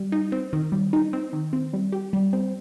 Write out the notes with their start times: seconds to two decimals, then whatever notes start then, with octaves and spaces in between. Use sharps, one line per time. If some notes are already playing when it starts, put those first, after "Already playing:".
Already playing: G3
0.12 D#4
0.32 C4
0.53 D#3
0.72 G3
0.93 D#4
1.13 C4
1.33 D#3
1.53 C4
1.73 G3
1.92 G4
2.13 G3
2.33 C4